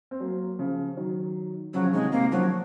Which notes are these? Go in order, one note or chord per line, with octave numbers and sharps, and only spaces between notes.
C4
F#3 A#3
C#3 F3
D#3 F#3
C#3 F3 F#3
C#3
C3 D#3 G#3
C3 D#3 A#3
C#3 F3 F#3